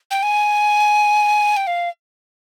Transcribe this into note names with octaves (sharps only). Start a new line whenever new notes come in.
G5
G#5
G5
F5